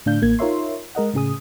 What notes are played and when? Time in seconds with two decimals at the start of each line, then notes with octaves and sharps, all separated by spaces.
0.06 A2 D3 D4 F5 G6
0.22 A1 A#3 G#6
0.39 D#4 F4 A#4 C#5 E5 C6
0.95 G#3 A#4 D#5 F#5
1.14 A2 C#3 G#4 D#6